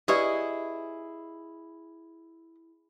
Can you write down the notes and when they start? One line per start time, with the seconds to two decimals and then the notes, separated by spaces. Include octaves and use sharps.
0.08 E4 G4 G#4 B4 D5 D#5 F#5 C#6